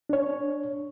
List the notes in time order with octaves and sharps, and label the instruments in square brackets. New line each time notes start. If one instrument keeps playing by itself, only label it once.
[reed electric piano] D4 C#5